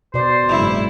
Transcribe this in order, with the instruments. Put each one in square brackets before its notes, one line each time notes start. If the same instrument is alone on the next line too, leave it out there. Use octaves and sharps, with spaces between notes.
[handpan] B2 D5 [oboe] C5
[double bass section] F#1 G#2 [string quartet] E4